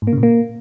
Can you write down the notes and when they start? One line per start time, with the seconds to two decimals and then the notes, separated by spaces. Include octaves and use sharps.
0.02 G#2
0.07 A#3
0.13 C#3
0.18 A#2
0.23 A#3